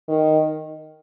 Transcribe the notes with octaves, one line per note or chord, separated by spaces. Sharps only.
D#3